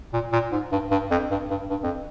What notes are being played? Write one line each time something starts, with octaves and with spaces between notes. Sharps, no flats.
A#2
A#2
G#2
G2
G2
F2
G2
G2
G2
F2